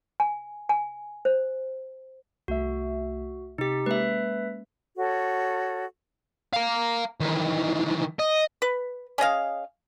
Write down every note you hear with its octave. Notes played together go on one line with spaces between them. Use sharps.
G#5
G#5
C5
C2 A3 F#4 E5
C3 D#4 G4 B6
G#3 A#3 C#4 B4 E5
F#4 A4 C#5
F5 A#5
D#3 E3
D#5
B4
C#4 G#4 D#5 F5